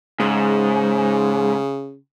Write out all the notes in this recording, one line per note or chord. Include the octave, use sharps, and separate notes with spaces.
G#2 C#3